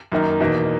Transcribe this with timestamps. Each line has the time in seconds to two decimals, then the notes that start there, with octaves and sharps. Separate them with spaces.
0.12 F#2 D#3 A#3 D#4
0.40 E2 B2 A#3 D#4